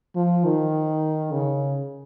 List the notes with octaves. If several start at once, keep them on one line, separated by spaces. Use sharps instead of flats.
F3
D#3
C#3